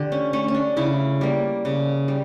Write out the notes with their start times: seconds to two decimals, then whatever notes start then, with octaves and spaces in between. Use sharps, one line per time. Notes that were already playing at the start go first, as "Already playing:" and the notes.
Already playing: D3 F4 G4
0.12 C#4
0.33 A3 C#4
0.48 C#4
0.54 D4
0.77 C#3 E4
1.21 G3 A#3
1.65 C#3
2.08 G3